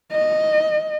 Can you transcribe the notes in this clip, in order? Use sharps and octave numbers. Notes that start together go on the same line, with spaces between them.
D#5